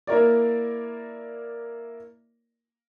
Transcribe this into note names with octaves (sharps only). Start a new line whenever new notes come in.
A#3 E4 A#4 C#5 D5